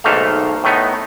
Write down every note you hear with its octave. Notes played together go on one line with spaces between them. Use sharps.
B1 G#2 A3 A#3 A4 F5
A2 A3 B3 D#4